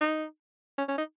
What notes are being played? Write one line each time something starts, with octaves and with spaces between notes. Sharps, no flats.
D#4
C#4
C#4
D#4